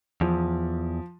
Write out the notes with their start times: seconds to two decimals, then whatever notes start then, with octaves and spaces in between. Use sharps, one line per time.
0.21 E2 F3